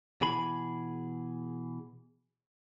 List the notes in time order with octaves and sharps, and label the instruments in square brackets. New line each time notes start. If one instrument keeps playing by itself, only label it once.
[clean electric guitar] B2 E3 G#4 B5